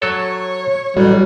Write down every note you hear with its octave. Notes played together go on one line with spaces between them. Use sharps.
F#3 A4 C#5
A1 F#3 G3